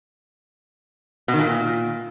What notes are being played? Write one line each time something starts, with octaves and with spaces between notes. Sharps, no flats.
B2
D#3
A#2